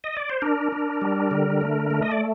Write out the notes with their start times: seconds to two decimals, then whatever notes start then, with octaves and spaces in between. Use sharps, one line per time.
0.04 D#5
0.17 D5
0.29 C5
0.42 D4 A#4
0.72 D4
1.01 G3
1.31 D3
1.61 A3
1.91 A3
2.02 D#5
2.12 D5